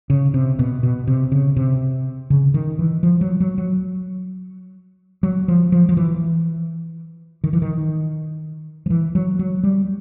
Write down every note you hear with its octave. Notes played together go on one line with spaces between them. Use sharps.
C#3
C3
B2
B2
C3
C#3
C3
C#3
D#3
E3
F3
F#3
F#3
F#3
F#3
F3
F3
F3
E3
D#3
E3
D#3
F3
E3
F#3
F#3
G3